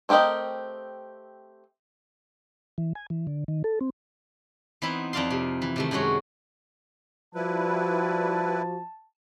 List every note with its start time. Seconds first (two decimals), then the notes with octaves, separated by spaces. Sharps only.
0.09 A3 C4 G4 A#4 D#5
2.78 E3
2.95 G#5
3.10 E3
3.27 D3
3.48 D#3
3.64 A4
3.81 C4
4.82 E3 B3 C4 D#4 E4
5.13 F2 D#4 D5 F5 A5 C6
5.31 C3
5.62 E3
5.76 C3 D#3 A3
5.91 F#2 C3 G#3 F#4 C#5
7.35 F3 G3 E4 F#4 B4 A5